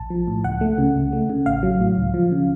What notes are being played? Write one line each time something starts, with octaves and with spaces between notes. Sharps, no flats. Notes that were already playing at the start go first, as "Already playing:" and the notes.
Already playing: A#1 A5
F3
A2
C#2 F#5
A3
C#3
C#2
A3
C#3
A1 F5
F#3
A2
C#2
F3
C#3